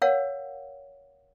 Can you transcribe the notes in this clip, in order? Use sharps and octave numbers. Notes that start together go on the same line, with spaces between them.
A#4 C#5 F5 F#5